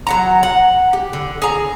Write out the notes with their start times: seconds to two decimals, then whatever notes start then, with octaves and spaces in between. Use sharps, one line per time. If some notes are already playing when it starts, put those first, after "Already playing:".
0.07 F#3 F#5 A#5
0.43 F#5
0.93 G4
1.13 D3
1.42 G#4 A#5